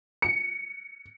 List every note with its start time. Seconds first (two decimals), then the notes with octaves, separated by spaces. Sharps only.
0.22 C#7